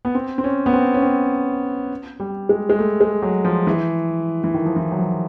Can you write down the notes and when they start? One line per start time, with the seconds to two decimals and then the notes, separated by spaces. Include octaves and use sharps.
0.05 B3
0.15 C4
0.38 C4
0.44 C#4
0.66 B3
0.73 C4
0.94 C#4
1.02 C4
2.20 G3
2.49 G#3
2.70 G#3
2.79 A3
3.01 G#3
3.22 F#3
3.45 F3
3.67 E3
4.44 E3
4.54 D#3
4.66 F3
4.76 E3
4.91 F#3
4.98 F3